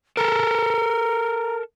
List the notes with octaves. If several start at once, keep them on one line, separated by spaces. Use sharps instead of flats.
A4 A#4 A#5